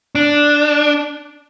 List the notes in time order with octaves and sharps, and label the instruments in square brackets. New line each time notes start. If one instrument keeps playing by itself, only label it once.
[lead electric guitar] D4